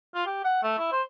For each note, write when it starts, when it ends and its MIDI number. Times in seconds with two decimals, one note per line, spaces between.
0.15 0.24 65
0.26 0.40 67
0.45 0.61 78
0.63 0.75 57
0.78 0.87 64
0.92 1.02 72